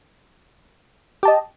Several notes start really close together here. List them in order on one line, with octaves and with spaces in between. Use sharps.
G4 A5 D#5